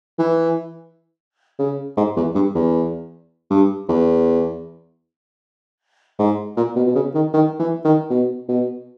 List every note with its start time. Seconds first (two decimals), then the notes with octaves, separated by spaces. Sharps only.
0.18 E3
1.59 C#3
1.97 G#2
2.16 E2
2.35 G2
2.55 E2
3.50 G2
3.89 E2
6.19 G#2
6.57 A#2
6.76 B2
6.87 B2
6.95 C#3
7.15 D#3
7.33 D#3
7.59 E3
7.85 D#3
8.10 B2
8.49 B2